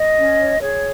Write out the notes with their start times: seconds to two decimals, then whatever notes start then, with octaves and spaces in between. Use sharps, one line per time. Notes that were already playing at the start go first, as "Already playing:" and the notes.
Already playing: D#5
0.16 C#4
0.38 C#5
0.61 G#4 C#5